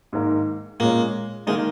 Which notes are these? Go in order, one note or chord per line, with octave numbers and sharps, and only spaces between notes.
G#2 D#3 A#3
A#2 G#3 A#3 C#4
D#3 G#3 A#3 D#4